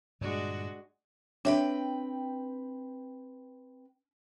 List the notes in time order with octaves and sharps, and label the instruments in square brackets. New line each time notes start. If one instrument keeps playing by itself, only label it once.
[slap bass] G2 A#2 D3 [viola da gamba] G#3 D4 F#4
[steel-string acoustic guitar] C4 B4 G5 [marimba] D4 C#5 E5